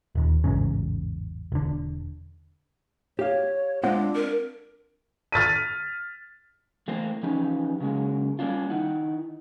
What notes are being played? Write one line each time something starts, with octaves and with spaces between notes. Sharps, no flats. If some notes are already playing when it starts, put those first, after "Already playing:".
D#1 D#2
A1 E2 G#2 C#3
E1 D3
G4 C#5 F5
G#3 C4 D4 F4 F#5
A#4
F6 A6 B6 D#7
E3 A3 A#3 C4 C5
E3 F3 C#4 D#4 G4 B4
C#3 F#3 G#3 A#3
G3 A#3 C#4 D4 F4
D#3 D#4 E4 F#5